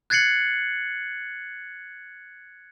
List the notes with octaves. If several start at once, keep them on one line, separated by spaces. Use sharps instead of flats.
F#6 G#6 A6 C7 C#7 F#7